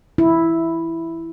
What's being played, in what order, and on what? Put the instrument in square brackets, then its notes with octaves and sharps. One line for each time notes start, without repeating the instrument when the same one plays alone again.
[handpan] E4